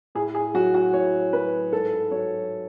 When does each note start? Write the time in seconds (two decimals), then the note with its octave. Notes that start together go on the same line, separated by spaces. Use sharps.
0.15 A2 G#4
0.35 G#4
0.54 F#3 F#4
0.74 F#4
0.93 A2 C#5
1.33 F#3 B4
1.72 G#2 A4
2.11 F#3 C#5